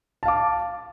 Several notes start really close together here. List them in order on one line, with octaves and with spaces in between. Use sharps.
A5 F5 D6